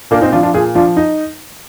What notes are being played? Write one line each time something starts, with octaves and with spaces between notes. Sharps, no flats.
A#2 A#3 D4
C4 D#4
F3 D4 F4
D4 F4
A#2 F4 G#4
F3 D4 F4
D#4